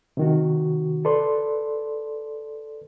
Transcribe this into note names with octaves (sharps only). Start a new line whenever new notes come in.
C3 D#3 F#4
A4 B4 D5 C6